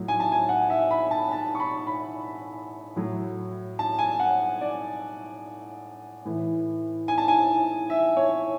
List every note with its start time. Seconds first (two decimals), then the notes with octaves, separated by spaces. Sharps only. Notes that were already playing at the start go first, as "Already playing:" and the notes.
Already playing: A2 F#3
0.08 G#5
0.20 A5
0.32 G#5
0.49 F#5
0.70 E5
0.91 B5
1.11 A5
1.32 A5
1.55 C#6
1.60 B5
1.87 B5
2.96 A2 F#3
3.79 A5
3.99 G#5
4.20 F#5
4.61 D5
6.25 A2 E3
7.08 G#5
7.18 A5
7.28 G#5
7.90 E5
8.17 C#5